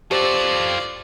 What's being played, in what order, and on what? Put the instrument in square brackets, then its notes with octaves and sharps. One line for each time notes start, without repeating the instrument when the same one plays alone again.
[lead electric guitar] F4 A4 [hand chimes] G4 C5 [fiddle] D5